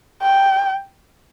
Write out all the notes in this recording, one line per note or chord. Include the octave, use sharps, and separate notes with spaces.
G5